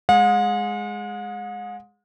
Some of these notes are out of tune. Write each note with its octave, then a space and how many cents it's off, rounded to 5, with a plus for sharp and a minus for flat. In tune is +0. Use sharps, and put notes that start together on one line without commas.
G#3 +0 G#4 +0 F#5 -45